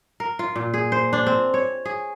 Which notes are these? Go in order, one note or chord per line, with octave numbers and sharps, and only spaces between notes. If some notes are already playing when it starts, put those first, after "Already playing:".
A#4
F4
A#2
G#4
C5
D4
C4
C#5
G#4